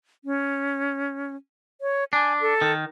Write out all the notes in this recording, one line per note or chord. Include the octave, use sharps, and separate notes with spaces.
C#4
C#5
D4 G#5
A4
D#3